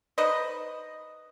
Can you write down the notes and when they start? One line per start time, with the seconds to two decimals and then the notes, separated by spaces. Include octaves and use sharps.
0.18 D#4 B4 C5 D#5